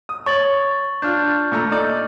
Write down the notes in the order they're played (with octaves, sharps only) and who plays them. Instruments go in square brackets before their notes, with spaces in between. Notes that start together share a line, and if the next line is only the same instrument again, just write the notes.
[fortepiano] D#6
[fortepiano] C#5 [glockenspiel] C#6 A6 F#7
[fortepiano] D4 F4 [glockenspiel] F6 G6
[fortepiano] A#2 A3 A#5
D#4 D5